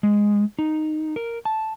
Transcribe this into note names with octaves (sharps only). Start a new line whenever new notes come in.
G#3
D#4
A#4
A5